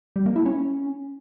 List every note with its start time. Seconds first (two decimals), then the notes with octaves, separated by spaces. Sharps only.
0.16 G3
0.26 A#3
0.36 E4
0.46 C#4